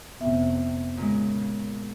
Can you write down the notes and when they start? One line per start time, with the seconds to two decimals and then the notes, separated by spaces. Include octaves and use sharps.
0.20 F1 C3 B3 E5
0.97 A#2 C#3 G#3